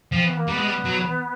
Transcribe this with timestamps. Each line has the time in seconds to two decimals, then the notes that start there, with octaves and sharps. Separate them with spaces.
0.12 F3 C4
0.24 B3
0.37 A#3
0.48 G3 B3
0.57 G#3
0.67 G3
0.85 F#3